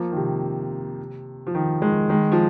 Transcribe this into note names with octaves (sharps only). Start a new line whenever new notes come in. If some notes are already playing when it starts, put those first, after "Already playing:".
Already playing: F3 A#3
D#3
C3
F3
D#3
D#3 G#3
D#3 G#3
F3